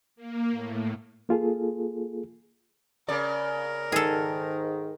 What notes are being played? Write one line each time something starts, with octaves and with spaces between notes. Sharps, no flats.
A#3
A2
A#3 F4 G#4 A4
C#3 A#4 D5
G#2 D#3 G#4 A4